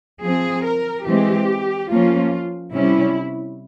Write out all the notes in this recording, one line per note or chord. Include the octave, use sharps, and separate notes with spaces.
F3 C4 G#4
A#4
E3 G#3 C4 G4
F3 A#3 C#4 F4
C3 G3 C#4 E4